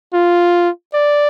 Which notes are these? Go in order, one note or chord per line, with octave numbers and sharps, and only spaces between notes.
F4
D5